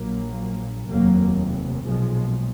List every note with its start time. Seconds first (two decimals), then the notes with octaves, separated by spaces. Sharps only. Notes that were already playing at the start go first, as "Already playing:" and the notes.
Already playing: A#1 A#2 F#3 A#3
0.89 F1 D#2 F#3 A#3
1.86 B1 A#2 F3 G#3